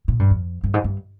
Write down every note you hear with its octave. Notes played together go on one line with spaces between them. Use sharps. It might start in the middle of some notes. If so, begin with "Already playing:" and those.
A#2
G2
F2
G2
G#2
G2